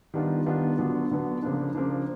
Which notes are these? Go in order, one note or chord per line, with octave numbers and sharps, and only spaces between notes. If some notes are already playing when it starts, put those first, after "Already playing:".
D#3 G3 B3 D4 F4
D#3 G3 B3 D4 F4
D3 F#3 B3 D4
D3 F#3 B3 D4
C#3 F3 A#3 D4
C#3 F3 A#3 D4